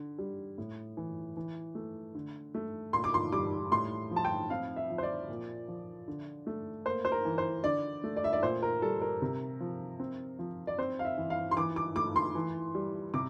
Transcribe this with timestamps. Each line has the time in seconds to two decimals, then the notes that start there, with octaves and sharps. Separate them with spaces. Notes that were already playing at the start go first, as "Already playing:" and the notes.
Already playing: D3
0.18 G3
0.58 A2
0.97 E3
1.37 E3
1.75 A3
2.15 D3
2.55 A3
2.93 A#2 C6
3.04 D6
3.14 C6
3.32 G3 D6
3.72 A2 C6
4.11 F3
4.16 A5
4.25 G5
4.50 C4 F5
4.76 E5
4.90 F3
4.98 C5
5.03 D5
5.29 A#2
5.68 F3
6.08 D3
6.47 A3
6.85 A#3 C5
7.05 C5
7.12 A#4
7.25 E3
7.38 C5
7.64 D3 D5
8.04 A3
8.16 D5
8.24 E5
8.33 D5
8.43 A#2 C5
8.62 A#4
8.82 G3 A4
9.01 A#4
9.22 C3
9.60 F3
10.00 C4
10.39 F3
10.67 D5
10.78 C4 C5
10.99 F5
11.05 E5
11.17 E3
11.30 F5
11.51 C6
11.56 E3 D6
11.76 D6
11.96 A3 D6
12.16 C6
12.35 E3
12.75 G3
13.14 C3 D6